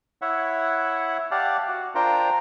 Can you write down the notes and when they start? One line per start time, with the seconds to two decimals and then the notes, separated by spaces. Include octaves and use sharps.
0.22 E4 C#5 E5 F#5
1.31 G4 D5 F5 F#5 A5
1.68 F#4
1.95 D4 F4 A#4 C5 G5 A#5